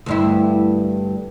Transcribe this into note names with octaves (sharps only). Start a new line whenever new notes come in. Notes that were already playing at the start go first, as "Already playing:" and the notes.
D2 G2 E4